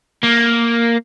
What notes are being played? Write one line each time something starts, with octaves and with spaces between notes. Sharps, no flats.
A#3